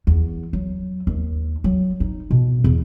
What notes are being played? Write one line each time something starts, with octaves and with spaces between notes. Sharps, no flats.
E2
F#3
D#2
F#3
D#4
B2
E2